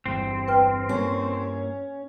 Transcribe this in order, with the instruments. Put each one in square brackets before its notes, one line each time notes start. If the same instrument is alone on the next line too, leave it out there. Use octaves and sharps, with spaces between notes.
[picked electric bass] G1 E2 G2 [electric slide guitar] C4
[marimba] B4 G5 F6
[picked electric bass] G2 A#3 [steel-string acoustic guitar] C#4